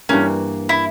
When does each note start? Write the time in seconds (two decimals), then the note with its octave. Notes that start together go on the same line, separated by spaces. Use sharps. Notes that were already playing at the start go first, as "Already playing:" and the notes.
0.09 G2 E3 A#3 C#4
0.69 E4